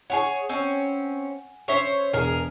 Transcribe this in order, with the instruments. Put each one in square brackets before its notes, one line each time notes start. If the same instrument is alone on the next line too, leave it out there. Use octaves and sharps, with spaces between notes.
[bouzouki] G#4 B4 C#5 [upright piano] F#5 G#5
[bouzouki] C4 C#4
[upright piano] C#4 E5 B6 [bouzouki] C5 C#5
[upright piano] E1 [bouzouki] G#4 A#4